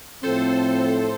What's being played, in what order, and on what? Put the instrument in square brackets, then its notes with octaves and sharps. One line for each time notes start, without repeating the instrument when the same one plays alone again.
[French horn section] A2 F3 C4 [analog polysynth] A4 C5